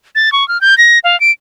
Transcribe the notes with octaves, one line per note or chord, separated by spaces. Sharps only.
A6
C#6
F6
G6
A#6
F5
D7